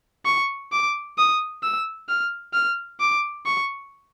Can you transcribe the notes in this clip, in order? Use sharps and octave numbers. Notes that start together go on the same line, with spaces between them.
C#6
D6
D#6
E6
F6
F6
D6
C#6